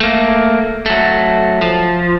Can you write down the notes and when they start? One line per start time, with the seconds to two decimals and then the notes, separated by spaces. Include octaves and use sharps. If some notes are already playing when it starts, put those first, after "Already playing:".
0.01 A3 A#3
0.86 F#3 A3
1.61 F3